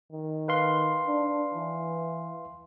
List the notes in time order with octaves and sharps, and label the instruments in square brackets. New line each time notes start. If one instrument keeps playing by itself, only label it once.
[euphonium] D#3
[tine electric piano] B4 F5 C6
[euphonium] D4
E3